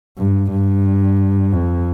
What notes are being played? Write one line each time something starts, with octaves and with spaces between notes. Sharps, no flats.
G2
G2
F2